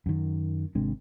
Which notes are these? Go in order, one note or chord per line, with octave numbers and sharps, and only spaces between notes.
F#2 D#3
G#1 C3 G#3 D4